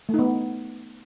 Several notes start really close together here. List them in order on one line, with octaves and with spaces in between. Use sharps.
A3 D#4 B3